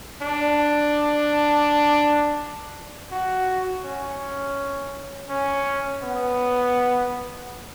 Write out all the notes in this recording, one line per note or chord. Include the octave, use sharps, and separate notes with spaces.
D4
F#4
C#4
C#4
B3